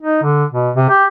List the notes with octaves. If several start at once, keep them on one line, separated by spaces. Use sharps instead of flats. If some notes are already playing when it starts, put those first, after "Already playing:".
D#4
D3
B2
C3
G4